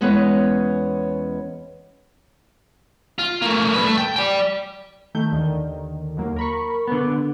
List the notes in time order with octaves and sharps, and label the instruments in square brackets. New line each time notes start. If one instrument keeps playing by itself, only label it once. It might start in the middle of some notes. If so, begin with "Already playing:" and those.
[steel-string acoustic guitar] E2 G#3 B3 C#4 C#5 D#5
[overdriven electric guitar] F4
A3 A#3
G2 B4
A3
G5
D5 G5
[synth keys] D#3 A3 G6
D#2 D3 D#3
D#2 F#3 A#3
A#4 B5 C#6
[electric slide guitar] D3 B3